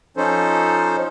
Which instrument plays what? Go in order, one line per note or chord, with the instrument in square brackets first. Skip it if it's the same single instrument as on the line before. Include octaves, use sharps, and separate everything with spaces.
[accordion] F3 C#4 D#4 A4 C5